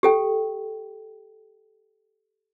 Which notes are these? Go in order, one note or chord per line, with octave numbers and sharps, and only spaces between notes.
G4 A4 G5